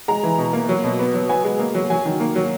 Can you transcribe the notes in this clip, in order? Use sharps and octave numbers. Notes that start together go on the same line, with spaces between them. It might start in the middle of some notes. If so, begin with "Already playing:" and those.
G#3 A#5
E3
B2
A#3
F#3
B2
B3
F#3
B3 G#5
G#3
A#3
F#3
F#3 G#5
D#3
A#3
F#3